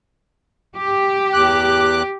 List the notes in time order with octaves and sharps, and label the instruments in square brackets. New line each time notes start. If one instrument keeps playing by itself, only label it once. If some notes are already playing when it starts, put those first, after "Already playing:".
[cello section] G4
[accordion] E2 D6 F#6